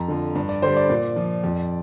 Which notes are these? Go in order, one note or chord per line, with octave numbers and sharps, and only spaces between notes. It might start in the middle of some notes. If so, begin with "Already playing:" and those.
Already playing: F2 A#5
D3 F3
G2
D5
D3 G3 C5
D5
A#2
F3
F2